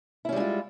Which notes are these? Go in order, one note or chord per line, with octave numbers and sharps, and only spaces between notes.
G3 G#3 C#4 E4 F4